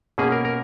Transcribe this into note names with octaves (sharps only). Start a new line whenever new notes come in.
B2 A#3 C#4 G#4
A#4
A#4